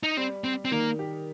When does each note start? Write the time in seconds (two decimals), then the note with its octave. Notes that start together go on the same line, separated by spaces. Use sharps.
0.03 D#4
0.17 G3 C4
0.44 G3 C4
0.65 C4
0.71 D#3 A#3
0.99 G4